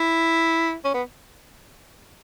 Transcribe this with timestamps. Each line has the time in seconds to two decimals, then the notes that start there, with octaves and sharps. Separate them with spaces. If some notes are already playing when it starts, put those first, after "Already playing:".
Already playing: E4
0.85 C#4
0.94 B3